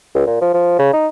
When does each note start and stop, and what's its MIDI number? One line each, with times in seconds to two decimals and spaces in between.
0.15 0.23 37
0.27 0.39 46
0.41 0.49 53
0.54 0.74 53
0.79 0.92 49
0.93 1.07 63